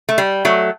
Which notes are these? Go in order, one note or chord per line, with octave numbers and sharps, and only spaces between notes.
A3
G3
F#3 A3